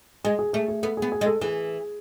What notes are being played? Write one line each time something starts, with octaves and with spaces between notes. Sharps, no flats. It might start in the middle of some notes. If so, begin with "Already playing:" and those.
G#3 G#4
G#4
A3 G#4
G#4
B3 A4
B3 G#4
G#4
G#3
A4
E3 G#4